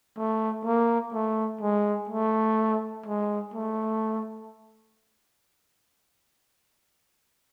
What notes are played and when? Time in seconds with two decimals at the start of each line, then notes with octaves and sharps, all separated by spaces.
0.18 A3
0.65 A#3
1.14 A3
1.62 G#3
2.09 A3
3.06 G#3
3.54 A3